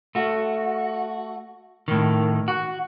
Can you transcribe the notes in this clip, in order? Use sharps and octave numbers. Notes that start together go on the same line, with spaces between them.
A3 F#4
A2 D#3
F#4